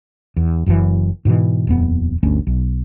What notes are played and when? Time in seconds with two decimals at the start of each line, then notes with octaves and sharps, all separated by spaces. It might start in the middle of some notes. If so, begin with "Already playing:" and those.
0.36 E2
0.66 F#1 F#2 A#2 E3
1.25 G#2 B2 D#3 E3
1.67 D#1 F2 B3
2.23 G1 D2 A3 C#4
2.47 B1